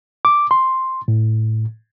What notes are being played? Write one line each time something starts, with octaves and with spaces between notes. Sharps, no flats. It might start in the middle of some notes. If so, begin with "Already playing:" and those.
D6
C6
A2